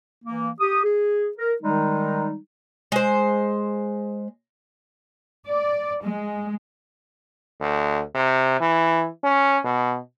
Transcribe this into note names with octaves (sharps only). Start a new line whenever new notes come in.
E3 A#3
G4 D#6
G#4
A#4
D#3 G3 G#3 D#4
G#3 C5
D5
G#3
D2
C3
E3
C#4
B2